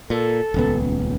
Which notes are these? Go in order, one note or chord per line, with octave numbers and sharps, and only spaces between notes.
A#2 A4
D#1 C#2 B3